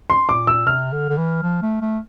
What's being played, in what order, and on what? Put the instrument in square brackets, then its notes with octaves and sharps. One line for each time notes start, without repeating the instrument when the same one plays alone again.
[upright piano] C6
[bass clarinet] A#2 [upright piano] D6
[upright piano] E6
[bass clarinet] C3 [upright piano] F6
[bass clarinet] D3
D3
E3
F3
A3
A3